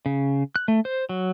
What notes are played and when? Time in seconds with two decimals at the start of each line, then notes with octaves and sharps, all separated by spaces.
0.06 C#3
0.56 F#6
0.68 A3
0.85 C5
1.09 F#3